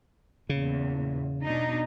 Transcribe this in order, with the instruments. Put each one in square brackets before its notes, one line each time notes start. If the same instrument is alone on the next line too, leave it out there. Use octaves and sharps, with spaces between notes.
[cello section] E2 A#2 [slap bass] C#3
[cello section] B2 D4 D#4